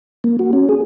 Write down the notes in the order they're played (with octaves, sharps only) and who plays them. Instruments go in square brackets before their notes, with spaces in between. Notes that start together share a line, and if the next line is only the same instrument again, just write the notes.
[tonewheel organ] A#3
F#4
C#4
G#4